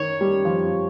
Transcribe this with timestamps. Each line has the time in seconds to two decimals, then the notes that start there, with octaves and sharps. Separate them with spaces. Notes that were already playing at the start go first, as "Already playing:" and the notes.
Already playing: D#3 C#5
0.21 G3
0.45 F3